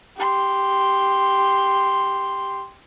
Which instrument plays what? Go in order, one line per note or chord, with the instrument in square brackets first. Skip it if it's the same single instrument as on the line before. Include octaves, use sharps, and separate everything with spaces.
[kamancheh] G4 C6